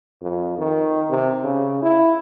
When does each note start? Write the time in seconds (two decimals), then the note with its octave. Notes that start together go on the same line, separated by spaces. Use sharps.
0.22 F2
0.58 D#3
1.09 C3
1.44 C#3
1.82 E4